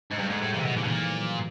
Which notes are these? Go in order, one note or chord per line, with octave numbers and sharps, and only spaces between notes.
G#2
G2 G#3
G#2 A3
A2 G3
A#2 E3
C3
B2 F3
A#2 D#3
B2
A#2 E3
F3
F#3
F3